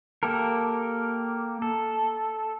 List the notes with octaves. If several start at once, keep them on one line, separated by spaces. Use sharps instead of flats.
A#3 G4 A4 A#4
A4